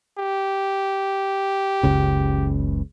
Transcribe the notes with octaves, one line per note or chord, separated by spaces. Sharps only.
G4
F#1 C#2 C#3